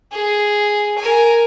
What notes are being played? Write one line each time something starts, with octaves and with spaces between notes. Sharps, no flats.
G#4
A#4 G#5